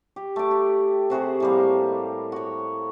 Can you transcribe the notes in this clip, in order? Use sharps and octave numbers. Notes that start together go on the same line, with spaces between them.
G4
A3 D6
G4
C3 F#4 G#4 C5
A2 G3 A#3
F#4 C#5